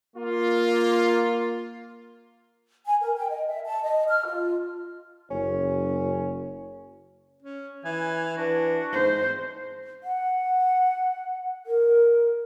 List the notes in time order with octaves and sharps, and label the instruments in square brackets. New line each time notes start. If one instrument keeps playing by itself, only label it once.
[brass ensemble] A#3 F4
[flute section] G#5
A#4
G5
D#5
E5
A5
D#5
F6
F4
[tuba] F#1 [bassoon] C#4
[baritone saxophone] C#4
[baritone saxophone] E3 [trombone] E4 [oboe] G#5
[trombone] E3 [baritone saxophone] D4 [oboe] F#4
[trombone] G#2 [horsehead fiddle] C5
[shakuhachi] F#5
A#4